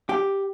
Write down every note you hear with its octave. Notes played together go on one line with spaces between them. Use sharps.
G4